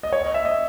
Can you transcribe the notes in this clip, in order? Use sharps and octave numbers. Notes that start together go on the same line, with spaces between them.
D#5
C#5
D#5
E5
D#5